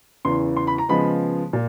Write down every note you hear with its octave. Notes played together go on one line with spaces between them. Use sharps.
E2 C#3 E3 C6
C6
B5
A#5
C#3 F3 G#3 B3 B5
A#2